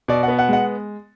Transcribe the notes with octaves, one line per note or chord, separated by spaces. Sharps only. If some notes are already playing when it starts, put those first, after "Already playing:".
B2 D5
B3 F#5
F#5
G#3 F#5